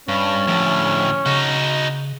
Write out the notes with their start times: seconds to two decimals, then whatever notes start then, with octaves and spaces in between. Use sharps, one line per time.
0.08 G2 C#4
0.47 D2 A2 F3
1.26 C#3 D#4 F#4